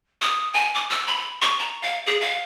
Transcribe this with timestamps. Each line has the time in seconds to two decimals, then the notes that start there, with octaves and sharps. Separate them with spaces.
0.21 D#6
0.54 G#5
0.75 D6
0.90 E6
1.07 B5
1.42 C#6
1.59 A#5
1.82 F5
2.06 G#4
2.21 F5